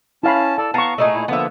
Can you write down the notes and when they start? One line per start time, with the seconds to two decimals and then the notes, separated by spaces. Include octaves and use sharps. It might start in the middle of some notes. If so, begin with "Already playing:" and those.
0.23 C#4 E4 F5 A5 B5
0.58 A4 D5 A5
0.74 B3 F5 A5 A#5 C#6
0.98 A#2 A3 D#4 G#4
1.14 A#2 E4
1.28 D3 F3 A#3 B3 E5